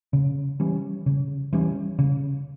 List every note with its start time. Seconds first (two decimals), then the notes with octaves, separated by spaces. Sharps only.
0.13 C#3
0.60 E3 G3 C#4
1.06 C#3
1.53 E3 G3 C#4
1.99 C#3